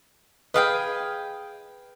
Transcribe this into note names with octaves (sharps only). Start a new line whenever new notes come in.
G#4 B4 D#5 F5 G5